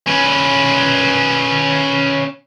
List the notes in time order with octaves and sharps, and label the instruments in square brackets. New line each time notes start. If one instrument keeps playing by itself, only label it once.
[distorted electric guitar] C#4 B4